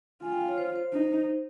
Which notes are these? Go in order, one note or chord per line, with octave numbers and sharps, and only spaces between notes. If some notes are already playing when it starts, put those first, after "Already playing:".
F4 G#5
G5
F5
C#5
C5
C5
D#4